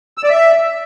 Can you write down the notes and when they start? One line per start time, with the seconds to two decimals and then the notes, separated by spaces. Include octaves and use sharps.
0.18 E6
0.24 D5
0.30 E5